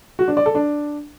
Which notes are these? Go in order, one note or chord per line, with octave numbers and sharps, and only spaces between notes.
F#4
D4
D5
A4
D4